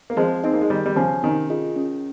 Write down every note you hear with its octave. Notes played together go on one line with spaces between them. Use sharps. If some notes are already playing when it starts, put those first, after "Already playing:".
A#3
F3 G#3 C4
C4 D#4 G#4 D#5
A#3
G#3
D#3 G3 G#4
G3
C#3 F3 C#5 G#5
C3 D#3 C#4
F4 G#4 D#5
C#4